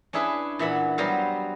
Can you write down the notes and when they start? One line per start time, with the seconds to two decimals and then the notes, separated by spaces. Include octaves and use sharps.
0.13 C#4 D4 E4 G#4 B4
0.59 A#2 E3 E5 F#5 B5
0.98 F#3 G3 B3 F#4 C5 F5